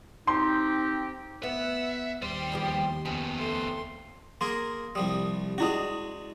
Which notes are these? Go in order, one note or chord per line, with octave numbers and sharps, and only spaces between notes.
C4 D#4 G4 C6
B3 E5 F#5
D#2 G3 C4 C6
E2 F3 G4
F2 C#3 B3
A3 C6
A#3 G#4 A#4 C6
C2 F3 G3 D#6
G#3 C#4 D4 E4 F#4 D#6